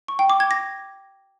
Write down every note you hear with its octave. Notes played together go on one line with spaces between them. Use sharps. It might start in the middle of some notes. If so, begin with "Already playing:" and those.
C#6
G5
D6
G#6
A#6